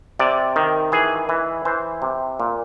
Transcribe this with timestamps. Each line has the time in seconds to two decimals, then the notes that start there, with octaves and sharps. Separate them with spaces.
0.19 C3 D5
0.56 D#3
0.92 E3 G#4
1.29 E3
1.65 E3 C5
2.02 C3
2.40 A#2